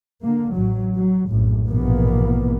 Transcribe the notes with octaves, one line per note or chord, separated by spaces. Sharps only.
D3 A#3
A1 F#3
F#3
A#1 F#2 A2
A#1 G#2 B2 E3 A#3 B3